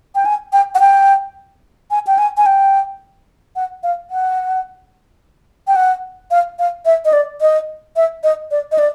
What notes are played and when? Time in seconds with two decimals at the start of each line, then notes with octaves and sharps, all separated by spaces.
0.15 G5
0.25 G#5
0.53 G5
0.75 F#5
0.80 G5
1.91 G#5
2.07 G5
2.18 G#5
2.37 G#5
2.46 G5
3.56 F#5
3.83 F5
4.11 F#5
5.67 G5
5.76 F#5
6.31 F5
6.59 F5
6.85 E5
7.05 D#5
7.13 D5
7.41 D#5
7.96 E5
8.24 D#5
8.51 D5
8.72 D#5
8.78 D5